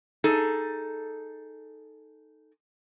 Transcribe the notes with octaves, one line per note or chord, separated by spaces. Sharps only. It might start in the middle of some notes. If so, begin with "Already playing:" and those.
D#4 G#4 A4